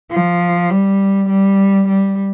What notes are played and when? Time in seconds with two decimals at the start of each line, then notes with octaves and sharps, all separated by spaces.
0.11 F3
0.70 G3
1.29 G3
1.88 G3